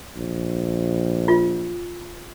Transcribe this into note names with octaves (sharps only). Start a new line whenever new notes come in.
A#1
F4